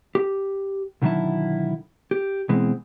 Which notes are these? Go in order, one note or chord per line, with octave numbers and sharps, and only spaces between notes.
G4
B1 D3 D#3 F#3 E4 A5
G4
B2 E3 G#3 C4